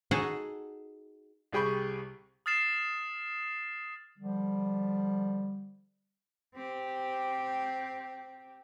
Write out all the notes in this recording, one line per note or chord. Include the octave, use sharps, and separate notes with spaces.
D#4 F#4 G#4 A4 D#5
C2 G3 G#4 G5 B5 C#6
D#6 F6 A6 C7 E7
D3 F3 G3
C4 G4